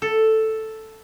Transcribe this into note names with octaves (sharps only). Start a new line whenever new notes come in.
A4